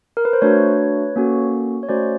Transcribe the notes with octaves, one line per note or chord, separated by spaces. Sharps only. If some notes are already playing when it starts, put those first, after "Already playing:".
A#4
B4
C5
A3 D4 F#4 B4 C#5
A#3 C#4 F#4 A4
C#5
A3 C#4 F#4 C5 D5